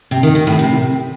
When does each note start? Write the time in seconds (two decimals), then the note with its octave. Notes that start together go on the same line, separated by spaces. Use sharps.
0.11 C3
0.23 D#3
0.35 D#3
0.47 A2
0.59 C3